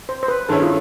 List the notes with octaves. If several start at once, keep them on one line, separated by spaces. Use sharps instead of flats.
C5
C5
B4
G2 D#3 G#3 C#4 E4 A4
F4